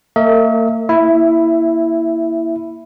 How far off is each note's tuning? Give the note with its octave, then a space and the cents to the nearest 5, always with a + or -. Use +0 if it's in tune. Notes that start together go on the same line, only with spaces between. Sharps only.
A#3 -45 A#4 -30 E5 -45
A#3 +10 E4 +0 E5 +20